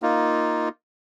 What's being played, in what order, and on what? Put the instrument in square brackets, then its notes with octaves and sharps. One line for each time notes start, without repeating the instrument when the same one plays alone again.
[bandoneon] A#3 D#4 F4